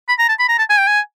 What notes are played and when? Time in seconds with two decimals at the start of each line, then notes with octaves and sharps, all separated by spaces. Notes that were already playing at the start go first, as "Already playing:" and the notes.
0.09 B5
0.19 A#5
0.29 A5
0.39 B5
0.49 A#5
0.59 A5
0.70 G#5
0.78 G5
0.87 G#5